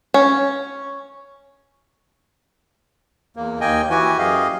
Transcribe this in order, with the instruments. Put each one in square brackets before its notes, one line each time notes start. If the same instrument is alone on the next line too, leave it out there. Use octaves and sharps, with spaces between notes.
[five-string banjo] C#4
[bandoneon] E2 A#3
D#2 A#3 D#5 G5 G#5
E3 F#4 G4 G#5
F#2 G4 G#4 D#5 F5